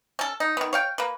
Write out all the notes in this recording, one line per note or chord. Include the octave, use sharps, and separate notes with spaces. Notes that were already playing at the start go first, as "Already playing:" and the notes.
C#4 A4
D#4
D#3 B3
C#5 F5 G5
A#3 B4